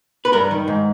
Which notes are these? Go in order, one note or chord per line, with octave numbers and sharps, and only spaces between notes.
B4
G2 A#4
D#3
G#2